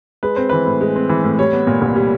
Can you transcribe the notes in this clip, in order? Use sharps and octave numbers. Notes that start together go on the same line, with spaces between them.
G#3 B4
C4 C5
E3 B4
A2
G#3
C4
E3
A2
G3 C#5
B3
A#2
C2
G3